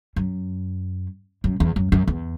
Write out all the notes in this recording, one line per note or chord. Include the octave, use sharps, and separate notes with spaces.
F#2
F#2
E2
F#2
F#2
E2